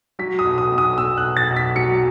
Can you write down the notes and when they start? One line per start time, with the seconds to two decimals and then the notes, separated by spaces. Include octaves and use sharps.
0.19 F#3 B6
0.39 D#6
0.45 B1
0.58 D#6
0.72 B1
0.78 D#6
0.97 B1 E6
1.17 F#6
1.24 B1
1.37 A6
1.50 B1
1.56 B6
1.76 F#3 C#7